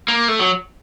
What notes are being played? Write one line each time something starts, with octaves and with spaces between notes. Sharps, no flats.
A#3
A3
F#3